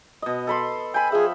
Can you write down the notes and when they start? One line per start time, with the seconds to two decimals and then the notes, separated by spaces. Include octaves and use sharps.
0.22 B2 D#5
0.47 A4 B5 C6
0.94 G5 G#5 B5
1.12 F3 G#4 E5